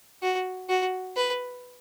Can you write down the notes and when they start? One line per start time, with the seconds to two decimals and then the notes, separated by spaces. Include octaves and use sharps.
0.22 F#4
0.69 F#4
1.17 B4